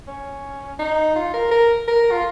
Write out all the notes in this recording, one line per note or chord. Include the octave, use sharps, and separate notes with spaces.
C#4
D#4
F4
A#4
A#4
A#4
F4